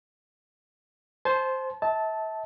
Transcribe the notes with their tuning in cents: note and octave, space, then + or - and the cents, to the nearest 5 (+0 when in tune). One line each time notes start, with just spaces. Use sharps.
C5 +0 A5 -35
E5 -35 A5 -5